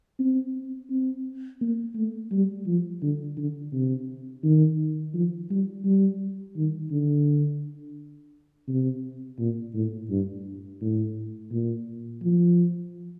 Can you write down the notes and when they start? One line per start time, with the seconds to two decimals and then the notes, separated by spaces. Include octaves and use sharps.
0.19 C4
0.90 C4
1.61 A#3
1.96 A3
2.32 G3
2.67 F3
3.02 D3
3.37 D3
3.73 C3
4.44 D#3
5.14 F3
5.50 G3
5.85 G3
6.57 D#3
6.91 D3
8.68 C3
9.39 A#2
9.74 A2
10.10 G2
10.81 A2
11.52 A#2
12.22 F3